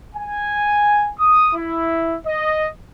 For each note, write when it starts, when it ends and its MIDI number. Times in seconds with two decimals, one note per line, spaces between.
0.14 1.10 80
1.18 1.50 87
1.53 2.14 64
2.25 2.66 75